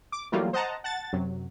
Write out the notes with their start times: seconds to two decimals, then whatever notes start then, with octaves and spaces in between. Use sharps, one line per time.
0.12 D6
0.32 E3 F#3 G3 A3 A#3 F4
0.53 C5 D#5 F#5 A5 A#5
0.84 F#5 A5 A6
1.13 F#2 C3 F#3